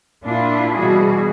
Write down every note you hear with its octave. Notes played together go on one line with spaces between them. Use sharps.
A#2 D4 E4 F4
B2 E3 G3 F#4 G#4